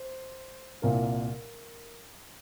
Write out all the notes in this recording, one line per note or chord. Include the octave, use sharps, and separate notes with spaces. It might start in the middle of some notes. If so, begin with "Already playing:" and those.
Already playing: C5
C2 A#2 A#4